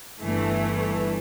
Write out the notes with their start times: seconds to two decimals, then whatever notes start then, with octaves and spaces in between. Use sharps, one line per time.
0.21 G1 G2 E3 A3